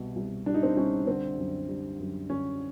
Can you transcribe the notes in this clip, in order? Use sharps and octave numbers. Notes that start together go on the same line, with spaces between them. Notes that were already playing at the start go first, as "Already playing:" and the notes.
Already playing: C2 B2
C2
G3 D4
D#4
C4 D4
C2 C#4
D3 C4
F#2
G3
F#2
D3 C#4